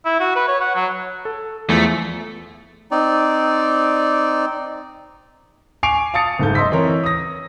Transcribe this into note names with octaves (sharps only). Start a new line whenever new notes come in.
E4
F#4
B4
C#5
F#5
F#3
A4
E2 F3 A3
C4 D#4 D5
G#5 C#6 D6 C7 D7 F7
F5 A5 D#6 A6 C#7
F#1 G#2 A4 G6
D#5 C6 E6 B6
E3 C4 A#4 C#5
D#6 A#6